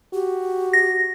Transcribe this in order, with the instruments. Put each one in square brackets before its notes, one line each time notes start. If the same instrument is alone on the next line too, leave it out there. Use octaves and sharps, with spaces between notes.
[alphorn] F#4 [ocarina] G4
[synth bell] A#6